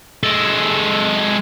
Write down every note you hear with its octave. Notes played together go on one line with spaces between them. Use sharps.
G#3 A4